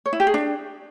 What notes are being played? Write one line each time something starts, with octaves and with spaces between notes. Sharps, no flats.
C#5
E4
G4
G#4
D4